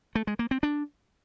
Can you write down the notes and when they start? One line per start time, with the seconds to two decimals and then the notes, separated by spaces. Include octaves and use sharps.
0.15 A3
0.27 G#3
0.39 A#3
0.51 C4
0.63 D4